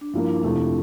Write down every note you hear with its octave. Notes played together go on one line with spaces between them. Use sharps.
D4
G2 F3 A#3 E4
D4
F2 C3 F3 A3 D4